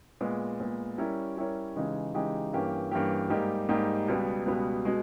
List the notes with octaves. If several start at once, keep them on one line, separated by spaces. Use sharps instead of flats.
A#2 G#3 B3
A#2 G#3 B3
G3 C#4 E4 A#4 C#5
G3 C#4 E4 A#4 C#5
C#3 E3 G#3 D#4 G4
C#3 E3 G#3 D#4 G4
G2 E3 A#3 C#4 G4
G2 E3 A#3 C#4 G4
G#2 G3 A#3 D#4 G4
G#2 G3 A#3 D#4 G4
C#2 B2 G3 B3
C#2 B2 G3 B3
B2 G#3